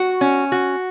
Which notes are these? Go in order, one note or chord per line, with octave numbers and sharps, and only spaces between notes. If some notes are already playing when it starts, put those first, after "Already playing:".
Already playing: F#4
C#4
F#4